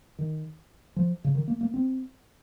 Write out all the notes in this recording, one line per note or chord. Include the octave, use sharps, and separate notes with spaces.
D#3
F3
C#3
D#3
A#3
A#3
C4